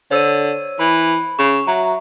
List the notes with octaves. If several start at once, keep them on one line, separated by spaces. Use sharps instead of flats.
D3 C5 C#5 E6 D#7
E3 B5
C#3 C#6 E7
F#3 E5 A#5